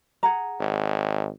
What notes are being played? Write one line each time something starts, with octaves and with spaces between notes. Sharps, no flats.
G#4 F#5 A#5
G#1